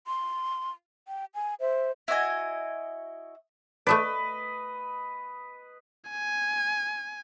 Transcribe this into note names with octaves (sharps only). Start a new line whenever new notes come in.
C6
G5
G#5
C5 E5
E4 F#4 D#5 G#5
A3 A4 B4 D5 D#5
G#5